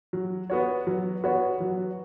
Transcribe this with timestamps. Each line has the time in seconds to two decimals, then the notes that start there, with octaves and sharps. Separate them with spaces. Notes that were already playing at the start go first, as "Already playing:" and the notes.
0.13 F#3
0.50 B3 F#4 C#5
0.87 F#3
1.24 B3 F#4 C#5
1.60 F#3